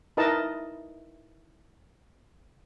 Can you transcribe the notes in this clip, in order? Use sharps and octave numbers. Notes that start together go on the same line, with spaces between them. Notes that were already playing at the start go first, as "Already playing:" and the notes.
D#4 E4 A#4 B4 D#5 A5